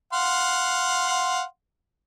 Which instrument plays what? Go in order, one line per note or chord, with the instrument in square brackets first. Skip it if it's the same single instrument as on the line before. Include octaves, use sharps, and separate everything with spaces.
[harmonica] F5 F#5 C6